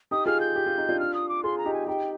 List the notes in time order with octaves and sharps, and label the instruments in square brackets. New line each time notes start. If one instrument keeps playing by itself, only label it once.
[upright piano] D#4 G4 [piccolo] D#6
[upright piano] F4 G#4 [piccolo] F6
[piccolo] G6
[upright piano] G4
F4
D#4
D4 F4
[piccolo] F6
D#6
D6
[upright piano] F4 G#4 [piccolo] C6
[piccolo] A#5
[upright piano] D#4 G4
[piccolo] G#5
[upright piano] D#4 G4 [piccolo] G5